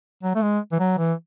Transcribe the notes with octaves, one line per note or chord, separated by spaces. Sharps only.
F#3
A3
G#3
E3
F#3
E3